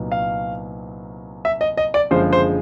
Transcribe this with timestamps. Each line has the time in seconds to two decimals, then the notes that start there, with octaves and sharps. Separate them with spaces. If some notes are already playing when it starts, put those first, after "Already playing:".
Already playing: C2 A#2 F#3 B3 D#4
0.12 F5
1.45 E5
1.61 D#5
1.77 D#5
1.94 D5
2.11 F#1 F#2 D3 F3 G#3 C5
2.33 C5